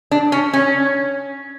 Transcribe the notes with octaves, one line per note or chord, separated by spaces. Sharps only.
D4
C#4
C#4